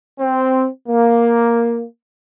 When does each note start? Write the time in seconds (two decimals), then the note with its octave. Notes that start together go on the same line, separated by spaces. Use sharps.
0.19 C4
0.88 A#3